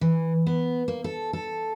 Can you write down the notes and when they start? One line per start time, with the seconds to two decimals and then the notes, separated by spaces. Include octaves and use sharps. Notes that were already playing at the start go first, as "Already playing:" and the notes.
0.01 E3
0.46 B3
0.88 A#3
1.04 A4
1.33 A4